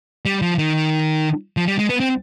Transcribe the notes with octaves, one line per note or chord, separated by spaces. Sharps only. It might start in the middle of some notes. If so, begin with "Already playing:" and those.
G3
F3
D#3
F3
G3
G#3
B3
C4